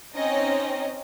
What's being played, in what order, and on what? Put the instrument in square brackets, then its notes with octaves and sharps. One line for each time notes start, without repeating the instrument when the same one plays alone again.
[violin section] C4 C#4 D#4 D#5